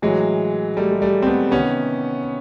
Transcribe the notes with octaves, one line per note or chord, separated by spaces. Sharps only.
A2 E3 F#3 G#3
G3 A3
G#3
G3 A3
C4
A3 B3
C3 D#3 B3 C#4